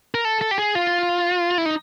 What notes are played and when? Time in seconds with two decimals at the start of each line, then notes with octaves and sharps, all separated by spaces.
0.14 A#4
0.25 A4
0.41 A4
0.51 G4
0.58 G#4
0.75 F4
1.58 E4
1.66 D#4